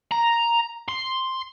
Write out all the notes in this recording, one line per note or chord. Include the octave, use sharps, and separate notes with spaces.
A#5
C6